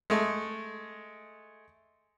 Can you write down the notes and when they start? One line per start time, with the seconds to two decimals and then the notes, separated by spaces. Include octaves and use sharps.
0.10 G#3 A3